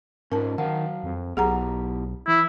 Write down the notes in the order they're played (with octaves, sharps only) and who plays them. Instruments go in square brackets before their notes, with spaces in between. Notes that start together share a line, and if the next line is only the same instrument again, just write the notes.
[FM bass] G#2 [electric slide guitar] C#4 F4 C5 [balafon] A#4 A5
[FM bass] D#3 [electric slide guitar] F#3 F5 A5 [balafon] F#5
[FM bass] F2
[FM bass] B1 [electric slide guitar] B3 E4 G4 [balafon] G#4 F#5 A#5
[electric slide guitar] E3 [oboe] E4